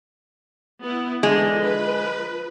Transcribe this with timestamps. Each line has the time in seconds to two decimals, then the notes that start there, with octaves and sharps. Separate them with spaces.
0.82 B3 E4
1.23 D3 E3 G#3 G#4
1.59 F3 B4